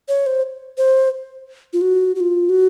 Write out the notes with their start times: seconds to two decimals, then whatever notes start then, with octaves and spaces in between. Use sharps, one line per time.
0.08 C#5
0.26 C5
0.78 C5
1.73 F4
1.81 F#4
2.15 F#4
2.20 F4
2.49 F#4